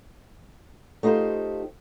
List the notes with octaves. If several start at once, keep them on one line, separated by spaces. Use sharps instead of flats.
A3 D#4 F4 G4 C5